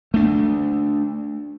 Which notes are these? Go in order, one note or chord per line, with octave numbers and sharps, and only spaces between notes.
A3 D4